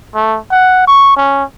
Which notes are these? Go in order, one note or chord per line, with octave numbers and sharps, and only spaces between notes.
A3
F#5
C#6
C#4